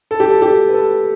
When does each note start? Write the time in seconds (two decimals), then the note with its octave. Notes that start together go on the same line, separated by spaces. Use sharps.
0.11 A4
0.20 G4
0.30 A4
0.42 G4
0.69 B4
0.74 A4